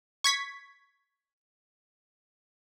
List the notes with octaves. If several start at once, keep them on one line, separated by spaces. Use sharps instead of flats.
C#6 G#6 B6